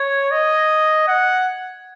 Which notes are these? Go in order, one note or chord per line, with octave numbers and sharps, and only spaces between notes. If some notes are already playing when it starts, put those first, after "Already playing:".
Already playing: C#5 G#6
D#5
F#5